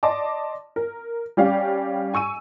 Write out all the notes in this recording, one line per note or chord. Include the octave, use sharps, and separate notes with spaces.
D5 D#5 A5 C6 D6
A#4
G3 C#4 G4 D5 F5
G#5 C#6 E6 D#7